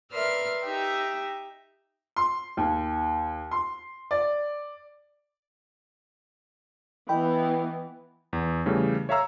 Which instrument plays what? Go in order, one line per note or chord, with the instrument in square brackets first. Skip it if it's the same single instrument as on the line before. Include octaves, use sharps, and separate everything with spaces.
[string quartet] A#4 B4 D5 E5 C6 F6
D#4 G4 E5
[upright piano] C6
D#2
C6
D5
[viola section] E3 B3 [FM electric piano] D#5 G5 B5
[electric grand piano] E2
C#3 E3 G3 A3
C#5 E5 F5 A#5 E6